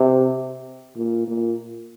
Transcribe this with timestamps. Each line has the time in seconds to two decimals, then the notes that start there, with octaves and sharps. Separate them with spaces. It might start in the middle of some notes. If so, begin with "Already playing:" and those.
Already playing: C3
0.96 A#2
1.27 A#2